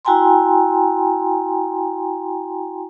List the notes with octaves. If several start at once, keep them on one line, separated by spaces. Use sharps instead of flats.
E4 F#4 G5 G#5 A#5 C6